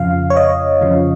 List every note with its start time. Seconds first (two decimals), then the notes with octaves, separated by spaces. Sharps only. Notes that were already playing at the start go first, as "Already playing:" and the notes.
Already playing: F2 C#3 F3 F5
0.30 C#5
0.37 D#5
0.81 F2 C#3 F3